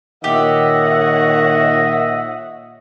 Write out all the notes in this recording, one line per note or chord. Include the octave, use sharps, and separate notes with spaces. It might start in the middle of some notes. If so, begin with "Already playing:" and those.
A#2 D#3 G4 C#5 D#5 E5 F#5